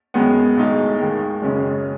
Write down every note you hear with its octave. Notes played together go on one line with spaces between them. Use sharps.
F#2 D#3 G#3 B3
B1 A2 G#3 D#4
D#2 D#3 G#3
F#1 F#2 C#3 G#3 C#4